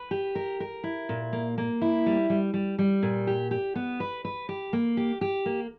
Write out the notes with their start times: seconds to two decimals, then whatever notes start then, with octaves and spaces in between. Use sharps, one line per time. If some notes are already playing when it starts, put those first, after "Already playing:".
Already playing: B4
0.11 G4
0.35 A#4
0.60 A#4
0.84 E4
1.09 A#2
1.33 A#3
1.58 A#3
1.82 E4
2.06 G3
2.30 G3
2.54 G3
2.79 G3
3.03 A#2
3.27 G4
3.51 G4
3.75 B3
4.00 B4
4.25 B4
4.49 G4
4.73 A#3
4.97 G4
5.21 G4
5.46 A#3